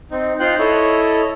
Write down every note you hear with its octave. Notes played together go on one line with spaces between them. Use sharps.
C4 D#4
D#4 F4 C5 G5 F#6
E4 A4 C#5 D#5